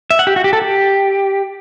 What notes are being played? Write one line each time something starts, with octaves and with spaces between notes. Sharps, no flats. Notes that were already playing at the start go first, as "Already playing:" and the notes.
E5
F#5
G4
F#4
G4
A4
G4